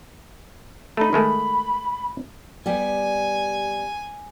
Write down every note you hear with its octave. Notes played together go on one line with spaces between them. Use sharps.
A3 D#4 B5
D#3 G#3 A3
G3 B3 G4 G#5